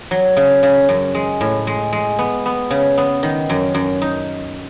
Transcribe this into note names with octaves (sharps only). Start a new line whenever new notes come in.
F#3
C#3
C#3
F#2
G#3
A2
G#3
G#3
B3
B3
C#3
B3
D#3
F#2
F#2
D#4